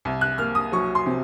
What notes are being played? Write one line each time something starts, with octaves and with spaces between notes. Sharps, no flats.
C2
F#6
A#3 F6
D#6
F#3 C#6
C6
C3